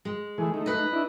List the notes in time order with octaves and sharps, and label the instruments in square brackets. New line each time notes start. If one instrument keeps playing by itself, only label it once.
[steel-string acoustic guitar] G#3
[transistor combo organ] E3 A3 G#4
A3 D#4
[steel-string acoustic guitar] B4 D#5
[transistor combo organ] D4 E4